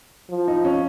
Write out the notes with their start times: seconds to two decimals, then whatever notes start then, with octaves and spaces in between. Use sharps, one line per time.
0.30 F3
0.48 D#4
0.65 C#4